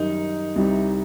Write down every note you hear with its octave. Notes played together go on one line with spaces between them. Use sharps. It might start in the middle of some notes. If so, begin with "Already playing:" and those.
Already playing: F#2 D#3 G3 D#4
C2 C3 G3